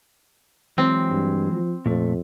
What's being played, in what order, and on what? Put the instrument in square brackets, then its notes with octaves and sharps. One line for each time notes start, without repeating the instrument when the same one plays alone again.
[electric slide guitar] E3 F#3 G#3 [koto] C4
[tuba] G2
F3
[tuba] F2 [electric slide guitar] A#2 A3